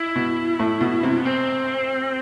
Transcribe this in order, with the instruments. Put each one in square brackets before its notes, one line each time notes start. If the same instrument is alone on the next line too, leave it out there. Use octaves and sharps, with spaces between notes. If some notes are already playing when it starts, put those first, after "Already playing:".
Already playing: [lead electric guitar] E4
[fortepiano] B2
A2
B2
C3
[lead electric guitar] B3
C4